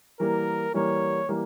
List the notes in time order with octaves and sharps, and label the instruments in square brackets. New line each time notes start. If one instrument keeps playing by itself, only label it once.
[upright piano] E3 G3 A#3 [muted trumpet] A#4
[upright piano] E3 G3 A#3 [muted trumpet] C#5
[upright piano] E3 G3 A#3